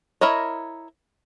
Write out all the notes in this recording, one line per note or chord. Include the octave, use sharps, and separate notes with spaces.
E4 A#4 C#5 D#5